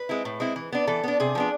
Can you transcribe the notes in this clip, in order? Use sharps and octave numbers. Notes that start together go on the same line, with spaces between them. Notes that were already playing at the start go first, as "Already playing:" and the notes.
Already playing: B4
G#3 C4 E4
A2
G#3 C4 E4
E3
B3 D4
E3 A4
B3 D4
C3 G#4
F3 B3 D4